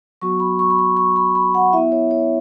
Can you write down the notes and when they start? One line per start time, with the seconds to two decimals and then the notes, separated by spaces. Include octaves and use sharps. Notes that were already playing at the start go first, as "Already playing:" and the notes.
0.21 F#3 B3 F#4 C#6
0.40 B5
0.59 C#6
0.70 B5
0.79 C#6
0.97 C#6
1.16 B5
1.35 B5
1.54 F#5
1.73 E4 E5
1.77 B3
1.92 C#5
2.11 C#5